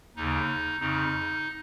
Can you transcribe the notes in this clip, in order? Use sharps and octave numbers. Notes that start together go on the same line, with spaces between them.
D#2 C#3 D#4
F2 C#3 D#4